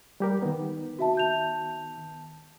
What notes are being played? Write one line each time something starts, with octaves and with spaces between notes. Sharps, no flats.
G3 G4 A#4
D#3 B3
F#4 E5 A5
A5 G6 F7